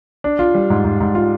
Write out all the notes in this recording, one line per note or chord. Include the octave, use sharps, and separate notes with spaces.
D4
F4
G3
G#2
G#2
G#2
F4